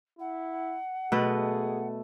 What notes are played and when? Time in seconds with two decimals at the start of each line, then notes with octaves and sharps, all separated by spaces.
0.19 E4 F#5
1.12 B2 A3 G#4 B4 D#5